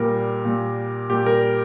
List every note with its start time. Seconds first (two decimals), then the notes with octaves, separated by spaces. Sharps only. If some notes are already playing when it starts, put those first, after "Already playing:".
Already playing: A#2 G3 A#4
0.45 A#2 G3
1.09 A#2 G3 G4
1.26 A#4